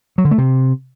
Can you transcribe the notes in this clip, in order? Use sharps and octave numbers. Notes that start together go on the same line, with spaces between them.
F#3
D3
A3
C3